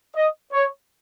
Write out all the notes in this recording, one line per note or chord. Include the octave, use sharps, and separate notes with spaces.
D#5
C#5